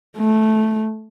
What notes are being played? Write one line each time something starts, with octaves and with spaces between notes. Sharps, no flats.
A3